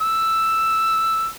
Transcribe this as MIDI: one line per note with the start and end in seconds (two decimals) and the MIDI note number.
0.02 1.26 88